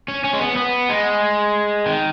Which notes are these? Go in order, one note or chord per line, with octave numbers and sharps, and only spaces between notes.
C#4
C#4
G#3
B3
B3
G#3
D#3